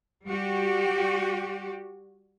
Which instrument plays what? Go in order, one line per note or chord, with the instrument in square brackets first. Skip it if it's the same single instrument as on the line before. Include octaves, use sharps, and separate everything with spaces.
[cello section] G3 F#4 G4